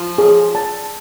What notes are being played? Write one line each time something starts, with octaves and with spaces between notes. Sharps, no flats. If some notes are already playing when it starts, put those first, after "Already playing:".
Already playing: F3
G#4
A5